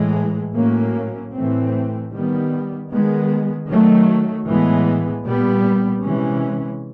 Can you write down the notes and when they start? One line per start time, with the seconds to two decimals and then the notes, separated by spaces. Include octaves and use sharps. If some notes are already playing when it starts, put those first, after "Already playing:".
Already playing: A2 E3 G#3
0.54 A2 F#3 A#3 C#4
1.33 A2 E3 A3 C4
2.11 D#3 G3 B3
2.89 D#3 G#3 B3
3.67 D#3 F#3 A3
4.46 A2 E3 G#3 B3
5.24 A#2 G3 B3
6.02 C3 E3 G#3 C#4